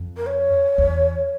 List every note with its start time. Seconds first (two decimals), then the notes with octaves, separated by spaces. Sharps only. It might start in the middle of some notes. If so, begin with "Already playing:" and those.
Already playing: F2
0.17 A#4
0.27 C#5
0.78 E2